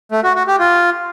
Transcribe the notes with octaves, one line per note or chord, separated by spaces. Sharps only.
A3
F#4
F#4
G4
F4